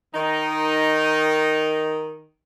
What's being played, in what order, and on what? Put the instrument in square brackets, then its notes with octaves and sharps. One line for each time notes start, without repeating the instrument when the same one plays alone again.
[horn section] D#3 D#4